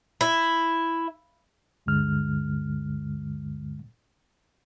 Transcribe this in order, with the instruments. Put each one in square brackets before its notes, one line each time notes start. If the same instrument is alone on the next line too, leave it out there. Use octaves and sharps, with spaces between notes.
[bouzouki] E4
[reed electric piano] D2 G2 D3 G#3 F6